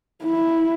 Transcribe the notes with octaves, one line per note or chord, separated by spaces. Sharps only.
E4